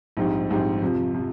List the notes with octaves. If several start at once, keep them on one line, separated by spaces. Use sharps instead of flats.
A#1 G#2 G3 C4 D#4
A#1 G#2 G3 C4 D#4
F2 C3 F3
C3 F3